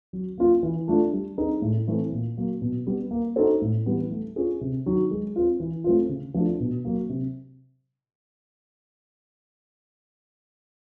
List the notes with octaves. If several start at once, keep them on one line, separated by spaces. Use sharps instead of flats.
F#3
A#3 C#4 F4
E3
A3 D4 F4
G3
C4 D#4 G#4
A2
E3 A3 C4
A#2
F#3 A#3
B2
G3 B3
A#3
D#4 F#4 A4 C5
A2
E3 G3 B3
A3
C#4 F4 G#4
C3
D#3 F#3
G#3
C4 F4
E3
A3 C4 F4
C#3
F3 A3 D4 F4
B2
F#3 A#3
C3